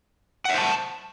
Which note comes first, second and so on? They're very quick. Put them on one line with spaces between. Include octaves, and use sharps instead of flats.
F#5 E5 C5 A5